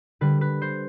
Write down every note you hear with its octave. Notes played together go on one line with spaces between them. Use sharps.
D3 G3 B4
B4
C5